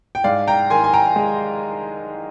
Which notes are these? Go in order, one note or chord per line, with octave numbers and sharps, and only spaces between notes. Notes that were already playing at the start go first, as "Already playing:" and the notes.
G5
G#2 D5 F5
G5 A#5
D#3 G#5 C6
G#5
G5 A#5
G#3